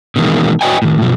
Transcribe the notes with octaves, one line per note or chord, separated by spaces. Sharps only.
B2 D#3 E3 G#3 A#3
F#4 B4 C#5 D#5 G5 G#5
A2 D#3
F#2 B2 F3